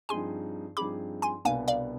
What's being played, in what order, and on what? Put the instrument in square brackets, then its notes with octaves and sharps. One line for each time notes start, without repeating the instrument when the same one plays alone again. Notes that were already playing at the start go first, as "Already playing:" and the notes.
[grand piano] G2 F3 C4 D#4 G#4 [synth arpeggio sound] G#5 C6
[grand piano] G2 F3 C4 D#4 G#4 [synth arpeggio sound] B5 D6
[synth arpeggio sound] G#5 C6
[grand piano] C2 B2 B3 D4 [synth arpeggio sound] F5 G#5
[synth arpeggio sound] D5 F5